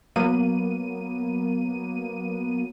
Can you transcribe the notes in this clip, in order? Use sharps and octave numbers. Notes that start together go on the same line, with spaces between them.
F#3 A#3 B3 D#7